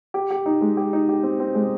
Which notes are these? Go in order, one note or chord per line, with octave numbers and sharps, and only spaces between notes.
G4
G4
D#4
G#3
G4
D#4
G4
C4
C4
G#3